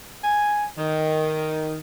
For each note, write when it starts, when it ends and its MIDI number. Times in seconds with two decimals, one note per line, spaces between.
0.24 0.65 80
0.78 1.79 51